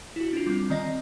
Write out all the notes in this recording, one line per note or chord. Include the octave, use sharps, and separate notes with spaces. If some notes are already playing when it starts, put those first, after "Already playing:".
E4 F#4
D4 F4
G3 C4
D#3 C4 D5 D#5 A#6